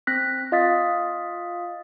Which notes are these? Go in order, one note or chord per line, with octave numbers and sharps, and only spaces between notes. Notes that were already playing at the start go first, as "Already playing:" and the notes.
C4 F#6 A#6 B6
F4 D#5 F5 D#6 A6 B6